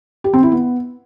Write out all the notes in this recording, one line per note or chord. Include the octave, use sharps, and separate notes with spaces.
G4
C4
E4
B3